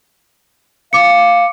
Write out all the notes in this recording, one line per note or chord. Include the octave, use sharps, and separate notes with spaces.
F5 D6 C#7